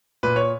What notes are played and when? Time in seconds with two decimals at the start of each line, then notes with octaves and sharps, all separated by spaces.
0.23 A#2 B4
0.36 C#5